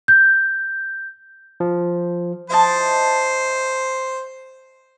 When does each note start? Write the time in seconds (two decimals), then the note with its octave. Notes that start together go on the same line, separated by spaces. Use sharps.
0.08 G6
1.60 F3
2.50 E4 C5 D#5 A5